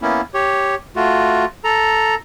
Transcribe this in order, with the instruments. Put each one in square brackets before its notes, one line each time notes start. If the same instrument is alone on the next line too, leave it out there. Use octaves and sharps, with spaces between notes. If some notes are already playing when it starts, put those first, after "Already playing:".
[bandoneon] A#3 B3 C#4 E4
G4 C#5
A3 F4 F#4
A4 A#5